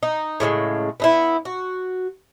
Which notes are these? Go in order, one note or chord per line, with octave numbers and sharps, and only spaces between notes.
D#4
A2 C#3 G3 G#3
B3 D#4 E4
F#4